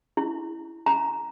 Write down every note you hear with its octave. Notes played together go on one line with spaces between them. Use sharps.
E4
A#5